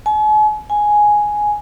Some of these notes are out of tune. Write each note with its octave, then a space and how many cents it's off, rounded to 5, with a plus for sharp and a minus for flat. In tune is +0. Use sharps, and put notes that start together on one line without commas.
G#5 +45
G#5 +5